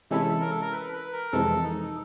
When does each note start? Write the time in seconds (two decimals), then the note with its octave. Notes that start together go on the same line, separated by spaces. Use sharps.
0.11 C3 E3 G#3 C#4 E4 A4
0.41 A#4
0.51 A4
0.62 A#4
0.72 B4
0.93 B4
1.13 A#4
1.32 F2 C3 E3 G#3 A4
1.63 D#4